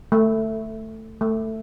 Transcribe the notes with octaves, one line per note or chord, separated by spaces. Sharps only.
A3
A3